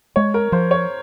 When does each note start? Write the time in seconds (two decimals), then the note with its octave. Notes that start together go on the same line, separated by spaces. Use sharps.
0.16 G#3 C#5
0.34 A#4
0.52 F3 C5
0.71 C#5